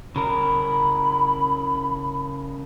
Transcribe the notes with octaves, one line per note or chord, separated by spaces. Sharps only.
C#3 A#4 B5